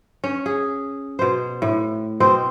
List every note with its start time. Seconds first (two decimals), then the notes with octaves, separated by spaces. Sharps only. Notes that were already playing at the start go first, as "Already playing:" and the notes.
0.24 C#4
0.46 G#4
1.19 B2 C5
1.62 A2
2.20 B2 C4 C5 D#5